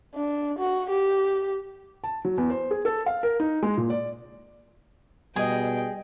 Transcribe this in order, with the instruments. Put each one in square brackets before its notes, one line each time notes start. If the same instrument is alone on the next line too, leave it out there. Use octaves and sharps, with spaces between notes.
[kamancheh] D4
F#4
G4
[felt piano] A5
F#3
E2
C5
G#4
A4
F5
A#4
D#4
G#3
A#2
D5
[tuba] B2 [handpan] G3 D#5 [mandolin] G#4 [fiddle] G5